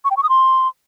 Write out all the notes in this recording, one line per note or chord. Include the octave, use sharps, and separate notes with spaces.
C#6
G5
C#6
D#6
C6